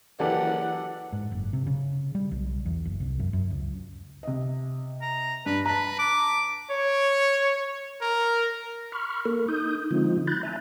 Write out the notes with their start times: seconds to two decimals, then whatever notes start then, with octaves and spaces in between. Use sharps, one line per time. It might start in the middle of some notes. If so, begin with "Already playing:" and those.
0.20 F#1 E3 G4 A4 D5 F#5
1.13 G#2
1.32 F#1
1.53 C3
1.66 C#3
2.15 G3
2.32 B1
2.65 E2
2.85 F#1
3.00 C2
3.20 F#2
3.33 F#2
3.50 C#2
4.23 C3 D#5
5.02 A#5
5.46 G2 B4
5.66 B4 A5 A#5
5.99 D6
6.70 C#5
8.00 A#4
8.92 B5 C#6 F6
9.25 A#3 A4 A#4
9.48 D#4 D#6 G6
9.91 D3 F3 G#3 C4 D#4 F4
10.27 B5 F#6 G6 A6
10.43 E5 G#5 A#5